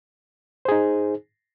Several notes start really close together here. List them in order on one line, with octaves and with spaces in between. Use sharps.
C5 G#4 D#4